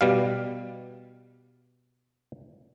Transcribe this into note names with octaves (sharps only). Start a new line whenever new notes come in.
B2 G3 F5